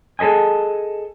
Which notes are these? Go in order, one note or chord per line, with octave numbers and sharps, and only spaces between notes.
G#4 A4 B4 D#5 G#5